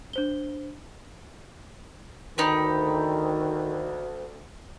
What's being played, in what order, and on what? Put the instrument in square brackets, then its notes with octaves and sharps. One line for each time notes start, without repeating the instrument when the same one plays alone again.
[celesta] D4 C5 G7
[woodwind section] D2 [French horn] D#3 [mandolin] D#4 G4 B4